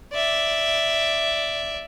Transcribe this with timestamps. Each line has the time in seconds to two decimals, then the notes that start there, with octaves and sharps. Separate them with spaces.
0.13 D5 E5